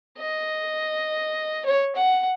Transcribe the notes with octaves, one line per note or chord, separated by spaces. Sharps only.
D#5
C#5
F#5